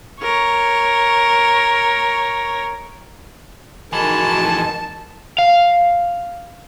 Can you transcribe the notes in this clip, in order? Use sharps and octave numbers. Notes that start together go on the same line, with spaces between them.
A#4 C#5
F2 E3 G#3 D#4 F#4 A#4 G#5 A5
F5